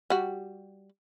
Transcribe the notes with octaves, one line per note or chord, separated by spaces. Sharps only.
G3 F#4